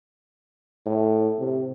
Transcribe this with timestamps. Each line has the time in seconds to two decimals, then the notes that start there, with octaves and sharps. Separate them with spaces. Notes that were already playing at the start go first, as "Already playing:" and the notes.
0.86 A2
1.39 C3